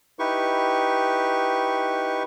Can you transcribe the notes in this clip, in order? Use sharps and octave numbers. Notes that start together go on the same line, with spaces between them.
D#4 E4 G4 B4 C#6